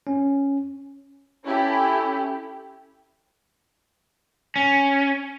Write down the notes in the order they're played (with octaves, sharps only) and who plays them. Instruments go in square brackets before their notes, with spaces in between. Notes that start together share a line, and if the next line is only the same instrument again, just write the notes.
[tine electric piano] C#4
[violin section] C#4 E4 G4 A4
[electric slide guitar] C#4